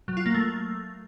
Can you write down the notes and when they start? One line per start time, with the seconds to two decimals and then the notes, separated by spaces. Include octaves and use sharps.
0.08 F#3
0.17 F4
0.26 A#3
0.34 A3